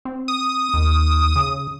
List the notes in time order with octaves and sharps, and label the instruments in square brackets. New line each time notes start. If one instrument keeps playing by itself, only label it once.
[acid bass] C4
[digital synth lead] D#6
[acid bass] D#2
C#3